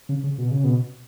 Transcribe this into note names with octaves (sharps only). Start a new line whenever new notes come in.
C#3
C#3
B2
C#3
B2